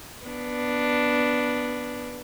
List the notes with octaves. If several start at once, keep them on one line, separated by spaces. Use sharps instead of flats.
B3 D4